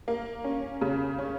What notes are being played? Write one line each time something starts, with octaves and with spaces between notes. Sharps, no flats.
A#3
C#4
C#3
C#4